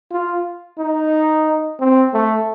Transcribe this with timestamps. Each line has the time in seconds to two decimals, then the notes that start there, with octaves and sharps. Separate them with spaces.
0.11 F4
0.78 D#4
1.79 C4
2.13 A3